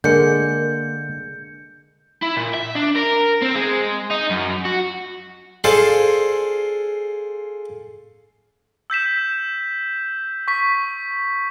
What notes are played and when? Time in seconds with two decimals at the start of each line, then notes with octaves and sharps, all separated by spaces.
0.04 D3 G#3 A#3 G6 C#7
2.22 E4
2.36 A#2
2.54 E5
2.75 D4
2.96 A#4
3.43 C4
3.56 G#3
4.11 D#4
4.30 F#2
4.65 F#4
5.64 F4 G#4 A4 C5 D5
8.90 E6 G6 B6 E7
10.48 C#6 B6